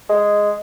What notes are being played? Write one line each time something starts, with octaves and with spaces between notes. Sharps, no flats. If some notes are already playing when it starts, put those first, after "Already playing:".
G#3